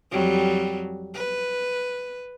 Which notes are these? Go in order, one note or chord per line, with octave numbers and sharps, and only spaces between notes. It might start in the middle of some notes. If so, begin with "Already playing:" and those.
F2 F#3 G3
B4